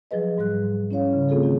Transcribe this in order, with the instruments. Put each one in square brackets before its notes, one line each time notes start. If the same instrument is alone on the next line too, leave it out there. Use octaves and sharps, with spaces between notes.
[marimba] F3 F#3 G#4 B4 D#5
G#2 G3 G#4 F#6
C#4 E4 C#5 F5
C#3
A3 C4 F4 G#4 A4
D#3 F4